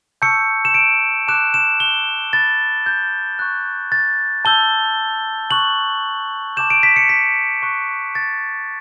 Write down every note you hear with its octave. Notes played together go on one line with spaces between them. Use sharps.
A5 C#6 E6 G6 C#7
E7
D7
A5 D6 F#6 E7
E7
G7
B5 F#6 A6
G6
C#6 F#6
A6
A5 E6 G6 G7
A5 C#6 F#6 F#7
A5 D6 G6 E7
D7
B6
C#7
B6
C#6 F#6
A6